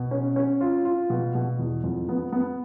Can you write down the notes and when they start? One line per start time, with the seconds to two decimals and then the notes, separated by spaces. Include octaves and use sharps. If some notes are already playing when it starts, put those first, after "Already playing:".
Already playing: B2
0.11 C#4
0.36 C#4
0.61 F4
0.85 F4
1.10 B2
1.35 B2
1.59 E2
1.84 F2
2.09 B3
2.33 B3